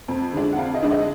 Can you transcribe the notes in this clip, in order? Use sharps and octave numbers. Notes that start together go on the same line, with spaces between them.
F2
D3 G#3 D4
F#5
F2 F5
D#5
D3 G#3 D4
D#5